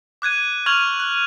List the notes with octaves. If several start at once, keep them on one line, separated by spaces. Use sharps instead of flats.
D6 F#6 G#6 D#7
C#6 F6 G#6 D#7 F7 F#7
F#6